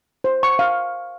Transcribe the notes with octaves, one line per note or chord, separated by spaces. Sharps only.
C5
C#6
F5